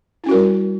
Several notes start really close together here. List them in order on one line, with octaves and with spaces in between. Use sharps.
E4 C#4 F#4 A#4 G3